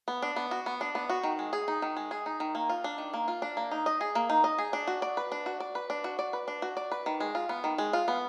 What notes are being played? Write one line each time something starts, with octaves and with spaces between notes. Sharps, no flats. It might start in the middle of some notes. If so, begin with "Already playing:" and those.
B3
D4
B3
F#4
B3
D4
B3
F#4
D#3
G#3
G#4
D#4
D#3
G#3
G#4
D#4
D#3
A#3
F4
D4
D#3
A#3
F4
D4
A#3
D#4
D#5
G#4
A#3
D#4
D#5
G#4
D4
F#4
D5
B4
D4
F#4
D5
B4
D4
F#4
D5
B4
D4
F#4
D5
B4
D#3
G#3
F4
B3
D#3
G#3
F4
B3